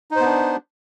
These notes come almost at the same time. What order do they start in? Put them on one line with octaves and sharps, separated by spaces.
D#4 C5 B3 D4